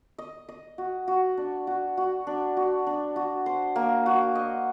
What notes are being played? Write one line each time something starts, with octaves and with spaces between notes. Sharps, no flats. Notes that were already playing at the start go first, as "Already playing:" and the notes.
D#5
D#5
F#4
F#4
D4
F#4
F#4
D4
F#4
D4
F#4
C5
A#3
F#4
D#5